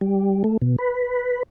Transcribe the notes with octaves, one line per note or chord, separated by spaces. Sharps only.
G3
A3
B2
B4